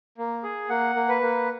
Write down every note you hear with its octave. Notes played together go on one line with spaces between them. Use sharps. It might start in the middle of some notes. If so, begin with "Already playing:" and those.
A#3
G#4
A#3 F#5
A#3
B4
A#3